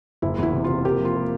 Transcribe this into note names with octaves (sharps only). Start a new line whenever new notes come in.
F#1 E4
E2 E4
C3
C3 F4
A#3 G4
F3
F4
A#3